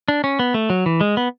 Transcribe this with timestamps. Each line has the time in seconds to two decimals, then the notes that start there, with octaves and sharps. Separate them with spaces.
0.08 D4
0.24 C#4
0.39 B3
0.54 A3
0.70 F#3
0.86 E3
1.01 G#3
1.17 B3